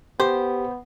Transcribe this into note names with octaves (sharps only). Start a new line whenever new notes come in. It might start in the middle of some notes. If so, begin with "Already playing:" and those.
B3 G4 C5